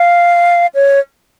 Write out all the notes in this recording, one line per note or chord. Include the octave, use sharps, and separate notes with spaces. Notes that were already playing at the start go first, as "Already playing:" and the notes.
Already playing: F5
C#5